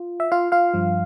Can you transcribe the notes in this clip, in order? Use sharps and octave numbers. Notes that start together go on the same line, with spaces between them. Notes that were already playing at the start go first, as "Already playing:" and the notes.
Already playing: F4
E5
F4 F5
F4 F5
G2 F3